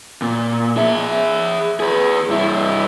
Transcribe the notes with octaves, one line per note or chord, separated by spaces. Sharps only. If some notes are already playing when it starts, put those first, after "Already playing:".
A#2
G#4 E5
G#4 B4
G2 E4